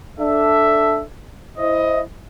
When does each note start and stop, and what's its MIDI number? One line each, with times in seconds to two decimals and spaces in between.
0.19 1.03 62
0.19 1.03 69
0.19 1.03 76
1.58 2.01 64
1.58 2.01 72
1.58 2.01 75